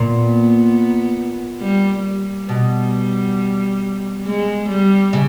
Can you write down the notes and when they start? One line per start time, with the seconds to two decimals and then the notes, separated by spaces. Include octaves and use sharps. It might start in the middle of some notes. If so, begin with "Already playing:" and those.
Already playing: A#2 B3
1.61 G3
2.04 G3
2.49 B2
4.26 G#3
4.69 G3
5.13 C#3